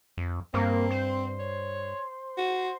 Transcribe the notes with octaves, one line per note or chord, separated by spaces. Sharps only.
F2
G2 A#3 C4
C5
C#5
F#4